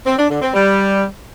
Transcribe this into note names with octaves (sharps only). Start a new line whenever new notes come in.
C4
D4
D3
C4
G3